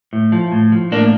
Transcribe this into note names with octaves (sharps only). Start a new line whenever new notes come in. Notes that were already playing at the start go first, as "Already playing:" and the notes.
A2
F3
A2
F3
A2 A#3 D4